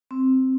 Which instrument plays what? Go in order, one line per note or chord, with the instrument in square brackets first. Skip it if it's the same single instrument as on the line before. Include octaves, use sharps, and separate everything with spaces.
[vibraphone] C4